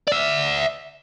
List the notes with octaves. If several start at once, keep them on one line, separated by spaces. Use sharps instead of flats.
D5 E5